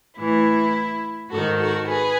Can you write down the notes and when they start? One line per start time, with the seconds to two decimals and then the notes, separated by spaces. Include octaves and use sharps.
0.17 A2 E3 E4
1.30 G#2 D#3 F#4 A4
1.58 F#4 A4
1.86 G#4 B4